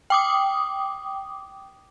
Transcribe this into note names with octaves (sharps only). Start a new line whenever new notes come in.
G5 D6 D#6